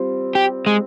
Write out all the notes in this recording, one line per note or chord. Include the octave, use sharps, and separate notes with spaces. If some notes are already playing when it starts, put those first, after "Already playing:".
Already playing: G3 C4 F4
G4
G#3